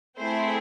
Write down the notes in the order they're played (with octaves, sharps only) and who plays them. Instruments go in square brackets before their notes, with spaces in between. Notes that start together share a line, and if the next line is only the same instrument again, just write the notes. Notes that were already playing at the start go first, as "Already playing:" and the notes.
[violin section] A3 C4 E4 G#4 C5